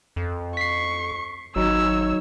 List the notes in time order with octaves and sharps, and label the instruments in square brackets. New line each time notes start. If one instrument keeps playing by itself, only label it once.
[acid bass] F2
[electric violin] C#6 [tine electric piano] B6 C7
[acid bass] G#1 [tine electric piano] F#3 D#4 [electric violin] C#5 E6